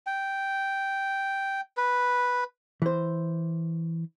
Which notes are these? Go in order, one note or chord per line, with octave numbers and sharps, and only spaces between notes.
G5
B4
E3 C5